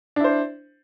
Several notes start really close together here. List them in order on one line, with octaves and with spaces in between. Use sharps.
D4 E4 C5